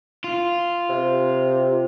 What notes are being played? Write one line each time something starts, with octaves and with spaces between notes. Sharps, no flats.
F4
C3